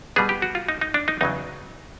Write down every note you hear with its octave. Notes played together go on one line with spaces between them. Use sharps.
B2 G3 B3 G#4
G4
F#4
F4
D#4
D#4
D4
D#4
E2 C#3 F#3 D#4